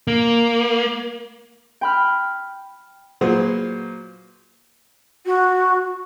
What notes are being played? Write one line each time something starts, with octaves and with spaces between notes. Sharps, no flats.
A#3
G5 B5 F6
A#2 F#3 B3 G#4 C5
F#4